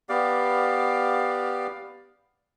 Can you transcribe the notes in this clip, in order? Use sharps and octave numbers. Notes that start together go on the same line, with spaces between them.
B3 G4 D5 F5